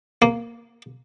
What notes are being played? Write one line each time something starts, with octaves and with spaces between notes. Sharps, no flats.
A#3